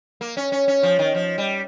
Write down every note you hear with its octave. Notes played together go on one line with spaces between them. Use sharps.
A#3
C#4
C#4
C#4
F3
D#3
F3
G3